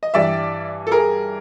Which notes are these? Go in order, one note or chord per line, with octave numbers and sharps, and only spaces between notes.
D#5
G2 E3 G3 D5 E5
A4
G#4 A#4